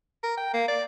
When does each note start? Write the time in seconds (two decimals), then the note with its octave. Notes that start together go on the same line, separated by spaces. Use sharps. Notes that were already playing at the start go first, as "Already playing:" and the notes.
0.24 A#4
0.38 G5
0.54 A#3
0.68 D5